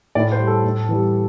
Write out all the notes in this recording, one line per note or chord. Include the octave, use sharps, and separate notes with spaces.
A2 D5
C5
G3
A4
A2
E3 G3